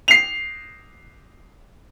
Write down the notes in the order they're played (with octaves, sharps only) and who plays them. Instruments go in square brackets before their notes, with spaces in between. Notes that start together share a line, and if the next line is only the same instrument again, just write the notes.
[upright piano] C7 F7